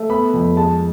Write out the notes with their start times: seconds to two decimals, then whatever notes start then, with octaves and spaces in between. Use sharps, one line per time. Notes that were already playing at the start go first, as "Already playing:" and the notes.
Already playing: A3
0.10 B3 B5
0.33 F2
0.57 G#3 A5